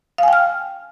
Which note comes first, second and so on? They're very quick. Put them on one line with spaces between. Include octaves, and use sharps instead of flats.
F5 G#5 G5 F6